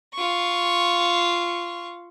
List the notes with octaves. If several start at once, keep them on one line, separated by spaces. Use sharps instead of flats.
F4 C#6